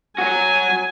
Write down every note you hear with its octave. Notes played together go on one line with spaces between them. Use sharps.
F#3 F#4 G#5